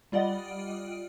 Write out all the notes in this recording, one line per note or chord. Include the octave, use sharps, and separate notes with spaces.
G3 F4 D5 D#5 F#5